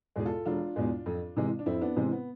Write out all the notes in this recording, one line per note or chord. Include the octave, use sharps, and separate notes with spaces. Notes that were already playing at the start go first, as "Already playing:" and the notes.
E2 B2 G#3 G#4
F4 A4
E1 D4 F4
E2 B2 G#3
F2
C3 E3 G#3
D4
F2 C4 E4
B3 D4
C3 E3 G#3 C4
B3